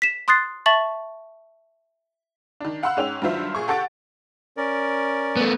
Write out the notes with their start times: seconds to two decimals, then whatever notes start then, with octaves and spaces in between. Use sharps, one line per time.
0.02 B6 E7
0.28 C6 D#6 F#6 A6 C7
0.66 E5 A5 C#6 A6 F#7
2.60 D#3 D4
2.83 F5 F#5 B5 C6 E6 F#6
2.97 G#2 C#4 G5 F7
3.22 G2 D#3 F#3 F4 C5 E5
3.55 A#2 G#4 C#6
3.68 G4 A4 F#5 C#6 A6 D7
4.57 C#4 A#4 D5
5.36 A3 B3